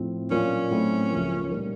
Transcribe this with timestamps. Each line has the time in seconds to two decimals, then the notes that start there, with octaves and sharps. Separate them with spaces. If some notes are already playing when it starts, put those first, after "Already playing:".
Already playing: A2 F3 A3 C4
0.31 A#2 F#3 A#3 C#4 D4 F4
0.71 A2 F#3 A3 C4 E4
1.10 C#2 C#3 F3 A#3
1.49 A#2 G3 A#3 D#4